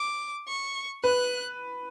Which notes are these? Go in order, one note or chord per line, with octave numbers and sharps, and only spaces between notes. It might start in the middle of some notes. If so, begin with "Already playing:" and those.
Already playing: D6
C#6
B4 F#6